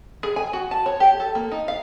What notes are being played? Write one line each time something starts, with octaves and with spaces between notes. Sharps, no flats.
G#4
G#5
F#4
A5
C#5
G4
A4
A#3
D#4
F5